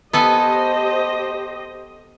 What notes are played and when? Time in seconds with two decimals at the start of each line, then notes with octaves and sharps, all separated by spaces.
0.13 B3 G4 A4 C5 D#5 G#5